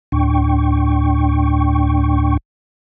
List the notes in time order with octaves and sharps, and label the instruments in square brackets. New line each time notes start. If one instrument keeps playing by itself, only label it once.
[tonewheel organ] D2 A2 D4 G5 C#6